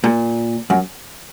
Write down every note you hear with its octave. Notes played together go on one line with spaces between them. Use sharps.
A#2
F#2